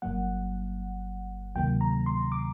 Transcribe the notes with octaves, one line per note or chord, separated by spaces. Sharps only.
G1 G2 F#3 A#3 F#5
D2 C3 D#3 F#3 A#3 G5
A#5
C6
D6